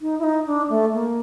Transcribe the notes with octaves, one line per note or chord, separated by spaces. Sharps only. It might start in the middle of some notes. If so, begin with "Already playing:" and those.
D#4
E4
D#4
D4
A3
A#3